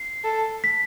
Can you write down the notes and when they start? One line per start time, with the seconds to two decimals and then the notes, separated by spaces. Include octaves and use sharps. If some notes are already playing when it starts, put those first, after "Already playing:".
Already playing: C7
0.24 A4
0.64 B6